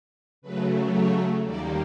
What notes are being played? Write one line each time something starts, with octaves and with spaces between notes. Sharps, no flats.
C#3 F#3 A3 B4
C#5
D#2 D#3 G3 A#3 D5